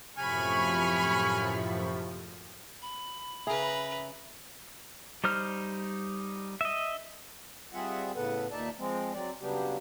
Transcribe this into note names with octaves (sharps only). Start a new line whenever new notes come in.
F#2 A2 C3 F3 G#5 B5 C#6 F6
B5
C#3 G#4 B4 E5 A#5
G3 D#4 C5 F6
D#5 E5
G3 C4 F4 G#4 E5 F#5
A2 C#3 B3 A4 B4 F#5
D#2 A#2 D#4 D5 E5 A5
F3 G#3 C4
F#3 C4 D5
C#3 F#3 G3 B3 D4 G4